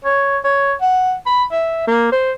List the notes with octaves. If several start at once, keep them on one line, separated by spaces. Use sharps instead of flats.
C#5
C#5
F#5
B5
E5
A#3
C5